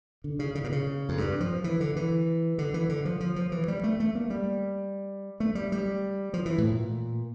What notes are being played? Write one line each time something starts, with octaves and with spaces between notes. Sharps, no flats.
D3
C#3
C#3
A#2
C#3
F2
G2
F3
E3
D3
E3
D3
E3
D3
F3
F3
F3
E3
G3
A3
A3
A#3
G3
A3
G3
G3
F3
E3
A2
A#2